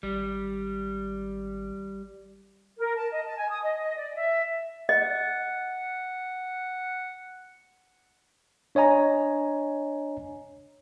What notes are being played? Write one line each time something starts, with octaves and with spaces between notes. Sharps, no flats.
G#1 G3
A#4
A5
D#5
A5
G#5
D#6
D#5
D5
E5
D#5 F#5
D4 C#5 D#5 G#5 A#5